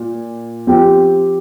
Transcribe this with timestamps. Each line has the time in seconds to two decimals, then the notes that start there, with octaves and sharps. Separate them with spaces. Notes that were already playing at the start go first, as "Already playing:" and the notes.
Already playing: A#2
0.67 F3 C4 G4